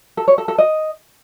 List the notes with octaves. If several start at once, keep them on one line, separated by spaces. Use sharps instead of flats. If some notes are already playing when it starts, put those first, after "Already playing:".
A4
C#5
A4
A4
D#5